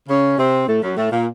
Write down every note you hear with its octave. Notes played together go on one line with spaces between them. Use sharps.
C#3 C#4
C3 C4
A2 A3
F#2 F#3
A2 A3
A#2 A#3